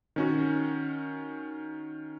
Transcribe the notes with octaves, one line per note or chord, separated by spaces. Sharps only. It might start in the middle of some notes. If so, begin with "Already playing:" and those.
D#3 C#4 F#4